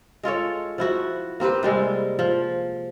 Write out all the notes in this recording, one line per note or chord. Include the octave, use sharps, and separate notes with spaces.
G#3 F4 A4 C#5
F3 E4 F#4
A#3 C4 G4 B4
C3 G3 G#3
F3